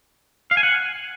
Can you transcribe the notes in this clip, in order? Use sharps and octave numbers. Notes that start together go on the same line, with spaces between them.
F5
G#5
F#5